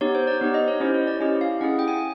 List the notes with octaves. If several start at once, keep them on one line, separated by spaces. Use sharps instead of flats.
B3 D#4 G4 C#5
C5
D5
B3 D#4 G4
D#5
C#5
C#4 E4 G4 C5
C#5
D5
C#4 E4 G4 D#5
F5
C#4 E4 G#4 F#5
G5
G#5